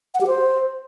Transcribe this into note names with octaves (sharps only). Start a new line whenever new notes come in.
F#5
G4
C5